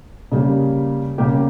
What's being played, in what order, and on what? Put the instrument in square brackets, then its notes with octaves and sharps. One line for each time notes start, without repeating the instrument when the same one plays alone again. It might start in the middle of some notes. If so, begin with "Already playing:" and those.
[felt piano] C#3 G3 A#3
C#3 G3 A#3 G4